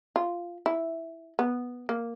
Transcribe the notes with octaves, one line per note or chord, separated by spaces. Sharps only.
F4
E4
B3
A#3